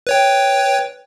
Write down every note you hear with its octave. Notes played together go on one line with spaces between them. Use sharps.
B4 C#5 G5